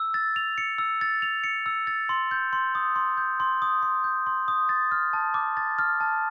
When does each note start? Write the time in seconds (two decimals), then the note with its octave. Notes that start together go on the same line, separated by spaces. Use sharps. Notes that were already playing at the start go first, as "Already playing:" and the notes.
Already playing: E6
0.14 A6
0.36 F7
0.58 C#7
0.78 E6
1.01 A6
1.22 F7
1.44 C#7
1.66 E6
1.87 A6
2.09 C6
2.31 G6
2.53 C6
2.75 D#6
2.96 C6
3.17 G6
3.40 C6
3.62 D#6
3.82 C6
4.04 G6
4.26 C6
4.48 D#6
4.69 A6
4.91 F6
5.13 A5
5.34 D6
5.57 A6
5.79 F6
6.01 A5